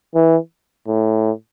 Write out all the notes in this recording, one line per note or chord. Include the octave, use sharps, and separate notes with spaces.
E3
A2